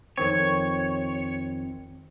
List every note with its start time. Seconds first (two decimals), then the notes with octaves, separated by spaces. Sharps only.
0.17 F2 D#3 C4 C#5